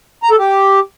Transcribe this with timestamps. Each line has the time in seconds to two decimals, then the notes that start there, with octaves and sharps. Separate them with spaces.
0.23 A#5
0.31 A4
0.39 G4